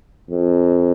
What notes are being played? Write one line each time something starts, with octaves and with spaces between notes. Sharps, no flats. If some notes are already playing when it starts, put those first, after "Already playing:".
F2